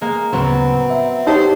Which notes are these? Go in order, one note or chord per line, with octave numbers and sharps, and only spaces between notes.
G#3 A#3
D2 A2 C#3 F#3 B3 C4
E5
D#4 G4 C5 C#5 A5